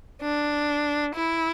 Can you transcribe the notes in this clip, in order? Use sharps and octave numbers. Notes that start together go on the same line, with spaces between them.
D4
E4